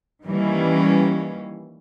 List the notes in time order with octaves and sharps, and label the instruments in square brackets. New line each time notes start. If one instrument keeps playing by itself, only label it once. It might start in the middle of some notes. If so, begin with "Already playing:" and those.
[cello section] D#3 E3 G3 A#3 C#4